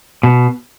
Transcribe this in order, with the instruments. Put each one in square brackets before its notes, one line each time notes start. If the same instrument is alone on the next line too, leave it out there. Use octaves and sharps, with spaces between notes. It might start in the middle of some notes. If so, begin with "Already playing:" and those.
[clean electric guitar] B2